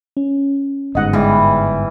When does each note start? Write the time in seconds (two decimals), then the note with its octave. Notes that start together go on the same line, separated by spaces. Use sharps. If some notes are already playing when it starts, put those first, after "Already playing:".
0.17 C#4
0.95 G1 G#2 D#5 F#5
1.13 E3 G3 G#3